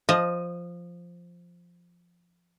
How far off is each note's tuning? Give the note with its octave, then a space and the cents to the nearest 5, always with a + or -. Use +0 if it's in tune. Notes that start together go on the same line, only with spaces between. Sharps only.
F3 +0 D#5 +0